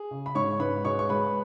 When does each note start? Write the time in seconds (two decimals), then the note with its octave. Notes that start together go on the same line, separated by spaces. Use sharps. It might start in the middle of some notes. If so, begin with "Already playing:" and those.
Already playing: G#4
0.11 C#3
0.26 B5
0.35 G#2 C#5 C#6
0.60 G#2 B4 B5
0.84 G#3 C#5 C#6
0.99 C#6
1.09 G#3 B4 B5